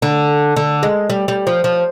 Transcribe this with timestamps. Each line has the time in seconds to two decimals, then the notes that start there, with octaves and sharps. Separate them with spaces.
0.02 D3
0.56 D3
0.83 G#3
1.10 G3
1.28 G3
1.47 F3
1.64 F3